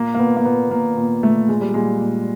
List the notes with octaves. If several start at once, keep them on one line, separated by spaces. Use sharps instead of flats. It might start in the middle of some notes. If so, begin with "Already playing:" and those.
Already playing: A#2 A#3
A#3
A#2 B3
A#3
A#2 B3
A#2 A#3
A#2
A#2 A3
A#2 G#3
G3
A#2 G#3
A#2